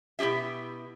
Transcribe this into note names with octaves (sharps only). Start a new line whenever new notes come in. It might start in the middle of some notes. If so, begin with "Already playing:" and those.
B2 E4 F#4 G4 E5